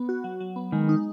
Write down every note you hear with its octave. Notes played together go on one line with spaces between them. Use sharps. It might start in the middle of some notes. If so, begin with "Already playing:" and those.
Already playing: B3
F#4
F#3
F#3
B3
D#3 G#3
D#4